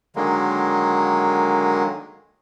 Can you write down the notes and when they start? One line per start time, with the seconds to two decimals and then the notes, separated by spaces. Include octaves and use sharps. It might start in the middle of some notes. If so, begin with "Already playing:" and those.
0.16 D3 D#3 F#3 G#3 A#3